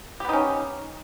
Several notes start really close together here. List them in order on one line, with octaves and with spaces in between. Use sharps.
G4 B3 D#4 C#4